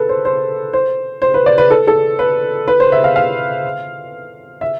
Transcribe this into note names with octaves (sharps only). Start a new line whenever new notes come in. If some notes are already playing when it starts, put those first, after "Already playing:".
Already playing: A4 B4
C5
C5
C5
C5
B4
D5
B4
A4
A4
B4
B4
C5
E5
F5
F5
E5